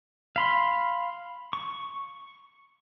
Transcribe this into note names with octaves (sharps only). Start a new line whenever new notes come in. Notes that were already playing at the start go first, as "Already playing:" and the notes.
F5 B5 C6
C#6